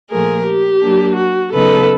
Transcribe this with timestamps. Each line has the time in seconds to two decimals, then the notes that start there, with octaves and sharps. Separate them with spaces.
0.10 A#2 F3 A3 G#4 A#4
0.46 G4
0.82 F#3 A#3 D4
1.17 F#4
1.53 C#3 F#3 B3 D#4 A4 B4